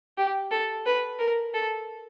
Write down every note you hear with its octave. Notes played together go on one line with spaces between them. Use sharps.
G4
A4
B4
A#4
A4